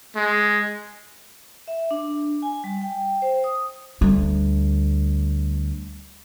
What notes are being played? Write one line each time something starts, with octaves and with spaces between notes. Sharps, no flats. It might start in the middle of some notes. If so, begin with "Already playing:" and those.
G#3
E5
D4
G#5
G3
G5
C5
D#6
D2 G3